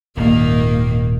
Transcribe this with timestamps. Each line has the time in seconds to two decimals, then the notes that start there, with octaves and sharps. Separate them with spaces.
0.17 D#1 G#2 D#3 A#3